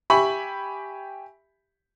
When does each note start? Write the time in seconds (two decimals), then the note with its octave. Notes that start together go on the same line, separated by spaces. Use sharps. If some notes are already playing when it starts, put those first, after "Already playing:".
0.10 G4 E5 G#5 B5 C#6